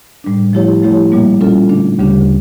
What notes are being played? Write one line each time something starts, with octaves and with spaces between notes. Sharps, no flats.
A2 G3 D4
F3 A3 E4 G4 C#5
F3 A3 E4 G4 C#5
A#2 G3 A#3
A#2 G3 C#4 F4 A4
D3 A3 D4
D2 C#3 G3 D4 G4